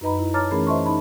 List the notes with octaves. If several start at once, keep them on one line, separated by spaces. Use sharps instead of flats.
F#2 D#4 B4 D#5 A#5 B5
E4
C#5 A5 A#5 D6 F6 A6
E3 A3 C#4 G#4 A#4 B5
C5 D#5 E5 A5 C6 C#6
D#4 A5 B5